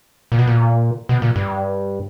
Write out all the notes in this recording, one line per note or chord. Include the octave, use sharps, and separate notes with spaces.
A#2
B2
A#2
B2
A#2
G2